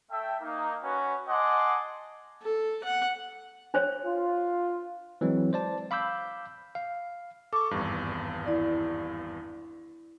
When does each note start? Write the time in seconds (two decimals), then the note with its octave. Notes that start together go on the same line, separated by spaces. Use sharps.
0.11 A3 E5 G5
0.41 A#3 D#4
0.83 C#4 F#4 B4
1.28 D#5 F#5 G#5 A5 C6 D6
2.42 A4
2.84 F#5
3.74 D4 C5 C#5
4.05 F4
5.21 E3 F#3 G#3 C4
5.53 C5 D5 A5
5.91 F5 B5 D6 E6 G6
6.75 F5
7.53 A4 C#6 D6
7.71 G#1 E2 G2
8.46 E4 D5